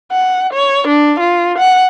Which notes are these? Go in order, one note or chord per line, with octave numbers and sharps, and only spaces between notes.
F#5
C#5
D4
F4
F#5